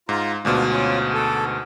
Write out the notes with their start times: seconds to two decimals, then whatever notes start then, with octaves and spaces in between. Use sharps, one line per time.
0.09 G#2 F4 A#5
0.45 D2 G#2 B2 D4 F4
0.72 C#4 F4
1.14 A4